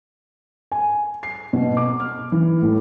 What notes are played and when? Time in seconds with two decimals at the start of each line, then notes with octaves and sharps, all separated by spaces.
0.72 G#5
1.23 C7
1.53 B2
1.77 D6
2.00 F6
2.32 E3
2.62 A2